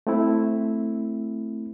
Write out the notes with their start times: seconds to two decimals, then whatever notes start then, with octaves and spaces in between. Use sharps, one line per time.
0.07 A3 C4 E4